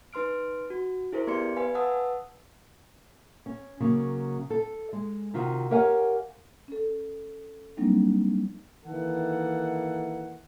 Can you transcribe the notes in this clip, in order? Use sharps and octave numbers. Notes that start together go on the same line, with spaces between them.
D#4 B4 C6 F6 D7
F#4
E4 G#4 A#4 C5
B3 G4 D5 C6 C#7
B4 F5 G#5 B5
B4 F#5 A5 D#6 E6
C#4
C#3 F#3 A#3
A4
G#3
C3 D#3 F4 F#4
G4 A#4 C#5 F5 F#5 G#5
C#4 A4
F#3 G3 A#3 C4 D4 D#4
D#3 E3 A#3 A4 F#5